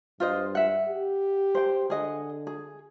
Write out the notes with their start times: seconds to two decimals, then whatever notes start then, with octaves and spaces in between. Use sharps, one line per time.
0.20 G2 F4 C5 D#5
0.55 E5 F#5
0.88 G4
1.55 C5 G5
1.90 D3 G#4 D#5 F#5
2.47 G#4